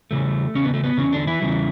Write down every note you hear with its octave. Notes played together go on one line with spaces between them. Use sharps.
E2 C#3 E3 G3 A3
E2 C#3 C#4
B3
A3
B3
E2 C#3 C#4
D3 D4
E3 E4
E2 C#3 E3 G3